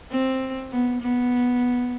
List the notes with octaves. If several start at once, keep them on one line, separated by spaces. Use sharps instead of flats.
C4
B3
B3